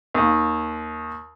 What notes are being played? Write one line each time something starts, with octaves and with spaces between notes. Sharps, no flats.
D#2